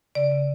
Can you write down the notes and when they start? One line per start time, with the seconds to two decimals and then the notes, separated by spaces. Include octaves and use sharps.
0.15 C#3 D5
0.32 C#3